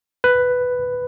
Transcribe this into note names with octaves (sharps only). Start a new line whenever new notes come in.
B4